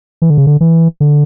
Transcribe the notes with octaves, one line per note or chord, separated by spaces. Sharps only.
E3
D3
C#3
D3
E3
D3